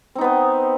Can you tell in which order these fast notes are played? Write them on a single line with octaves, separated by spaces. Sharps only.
C4 D#4 B3 D#5